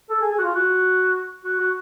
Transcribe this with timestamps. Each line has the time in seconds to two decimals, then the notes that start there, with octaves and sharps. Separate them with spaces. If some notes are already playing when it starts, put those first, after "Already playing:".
0.10 A4
0.21 G#4
0.31 G#4
0.38 F#4
0.43 F4
0.55 F#4
1.45 F#4
1.59 F#4